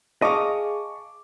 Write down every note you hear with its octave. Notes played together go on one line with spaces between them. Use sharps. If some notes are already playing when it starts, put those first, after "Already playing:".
G#4 D#5 F5 A5 C#6 D6